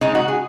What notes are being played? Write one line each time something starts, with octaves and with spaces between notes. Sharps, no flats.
C#3 G#3 D#4
F#4
G#4